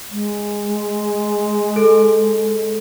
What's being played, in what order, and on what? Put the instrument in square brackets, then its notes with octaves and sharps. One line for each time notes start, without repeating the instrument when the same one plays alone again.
[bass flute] G#3
[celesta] A4